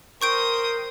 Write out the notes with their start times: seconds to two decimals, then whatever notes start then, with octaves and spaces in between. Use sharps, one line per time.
0.22 A#4 C5 G5 C#6 D#6 G6 D7